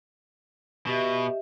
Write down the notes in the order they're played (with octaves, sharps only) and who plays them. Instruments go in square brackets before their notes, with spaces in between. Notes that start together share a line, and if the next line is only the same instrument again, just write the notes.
[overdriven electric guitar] B2 [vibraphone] G4 D#5 E5